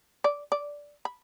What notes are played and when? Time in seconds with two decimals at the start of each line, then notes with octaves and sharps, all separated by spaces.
0.24 D5
0.52 D5
1.05 B5